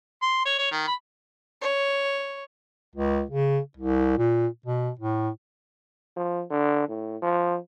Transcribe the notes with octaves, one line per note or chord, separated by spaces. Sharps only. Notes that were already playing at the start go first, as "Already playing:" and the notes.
C6
C#5
C#5
D#3
B5
C#5
C#2
C#3
C2
A#2
B2
A2
F3
D3
A2
F3